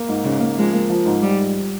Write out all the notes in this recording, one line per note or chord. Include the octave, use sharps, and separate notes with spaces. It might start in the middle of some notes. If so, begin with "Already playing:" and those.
Already playing: A#3
G#2
G#2 C#3
A#3
F3 G#3
A#3
F3
G#2
F3 G3
G#2